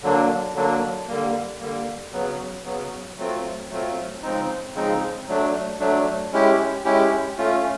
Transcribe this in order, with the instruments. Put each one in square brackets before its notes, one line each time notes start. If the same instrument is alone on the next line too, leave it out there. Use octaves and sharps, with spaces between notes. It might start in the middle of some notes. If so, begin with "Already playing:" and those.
[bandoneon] D3 F#3 A#3 D4
D3 F#3 A#3 D4
D3 G3 A#3
D3 G3 A#3
C#3 F#3 B3
C#3 F#3 B3
F#3 A3 C4 F4
F#3 A3 C4 F4
C#3 F3 G#3 C4 D#4
C#3 F3 G#3 C4 D#4
F#3 A3 D4
F#3 A3 D4
G#3 C#4 E4 G4
G#3 C#4 E4 G4
A3 C#4 F4